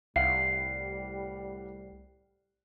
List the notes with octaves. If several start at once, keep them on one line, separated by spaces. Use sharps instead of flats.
C2 A2 G3 F5 F#5 C7